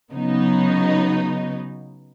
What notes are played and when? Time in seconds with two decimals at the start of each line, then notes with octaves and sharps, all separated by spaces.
0.11 C#3 F#3 B3 D#4